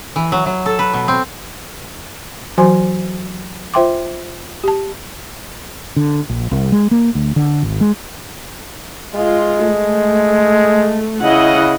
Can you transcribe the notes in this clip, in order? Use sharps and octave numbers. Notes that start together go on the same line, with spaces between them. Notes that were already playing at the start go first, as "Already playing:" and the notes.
E3
F#3
F#3
A4
B4
B2
C4
E3 F#3 F#4 C5 G#5 C6
F4 C5 E5 G5 C6 D6
G4 A5
D3
A#1
C2
G#3
A#3
D2
D3
G#1
G#3
G#3 F4
A3
C#3 E4 D#5 F#5